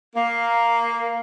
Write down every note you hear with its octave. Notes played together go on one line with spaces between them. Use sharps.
A#3